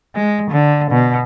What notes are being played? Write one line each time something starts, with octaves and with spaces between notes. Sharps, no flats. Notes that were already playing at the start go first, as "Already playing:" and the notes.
G#3
D3
B2